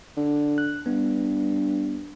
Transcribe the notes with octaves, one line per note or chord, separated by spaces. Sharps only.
D3
F#6
G2 B3